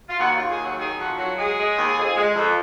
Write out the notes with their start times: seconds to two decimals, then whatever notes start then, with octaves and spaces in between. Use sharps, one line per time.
0.09 F4
0.20 D#2 F#4
0.34 D#2 F4
0.50 G#4
0.60 F#3 F#4
0.79 D#3 G#4
0.98 F2 F#4
1.18 F#3 F#4
1.38 G#3 G#4
1.57 G#3
1.77 D#2
1.96 F2
2.16 G#3
2.36 F2